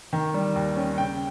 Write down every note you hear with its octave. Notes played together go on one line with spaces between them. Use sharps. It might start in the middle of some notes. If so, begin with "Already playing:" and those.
D#3
G3
D#2
C#4
C#3 G5